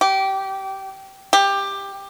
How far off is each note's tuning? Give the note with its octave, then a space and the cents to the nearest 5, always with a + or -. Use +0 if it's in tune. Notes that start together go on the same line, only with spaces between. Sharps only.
G4 -20
G4 +15